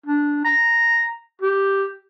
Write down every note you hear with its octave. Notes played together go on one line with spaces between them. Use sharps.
D4
A#5
G4